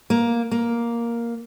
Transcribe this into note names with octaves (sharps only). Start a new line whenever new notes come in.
A#3
A#3